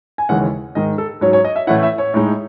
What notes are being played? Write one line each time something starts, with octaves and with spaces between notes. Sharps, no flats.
G#5
D#2 C#3 E3 G#3 C#4 F#5
G#2 D#3 G#3 D#5
A4
G#2 F#3 C#4 C#5
C#5
D#5
E5
A2 E3 A3 C#4 E4 F#5
E5
C#5
A2 G#3 D#4